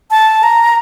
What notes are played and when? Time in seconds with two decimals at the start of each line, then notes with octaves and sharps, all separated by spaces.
0.11 A5
0.43 A#5